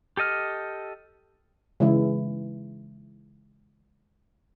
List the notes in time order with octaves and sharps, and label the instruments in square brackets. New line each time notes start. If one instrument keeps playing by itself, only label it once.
[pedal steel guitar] G4 A4 D#5 F6
[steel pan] C#3 E3 G#3 E4